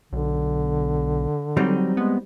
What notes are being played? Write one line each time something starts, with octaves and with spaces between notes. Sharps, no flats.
B1 D3
F#3 G3 C4 D#4
G#3 B3